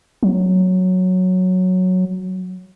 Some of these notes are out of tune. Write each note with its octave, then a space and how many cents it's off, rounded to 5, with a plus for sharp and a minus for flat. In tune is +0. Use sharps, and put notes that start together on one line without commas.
F#3 -5